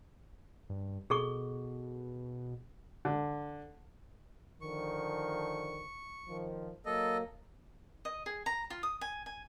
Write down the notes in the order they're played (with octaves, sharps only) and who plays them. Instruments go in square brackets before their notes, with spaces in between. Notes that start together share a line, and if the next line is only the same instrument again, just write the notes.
[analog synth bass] G2
[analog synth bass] B2 [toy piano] G#4 A4 C#6
[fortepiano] D3
[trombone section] D3 D#3 F3 [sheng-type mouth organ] C#6
[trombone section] D#3 F3
[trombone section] F#3 A#3 [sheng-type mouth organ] A4 D#5
[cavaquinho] D#5
G#4
A#5
F4
D#6
G#5
G#5